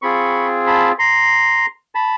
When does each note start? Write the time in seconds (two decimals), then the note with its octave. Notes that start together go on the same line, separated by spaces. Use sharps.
0.02 C4 F4 G#4 B5 C#6
0.67 A5 B5
0.99 A#5 C6
1.95 A5 B5